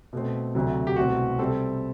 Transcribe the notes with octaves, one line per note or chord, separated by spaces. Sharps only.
B2 A3 C4
D2 C3 F#3
G4
C2 B2 A3 C4 F#4
C3 G3 C4 A4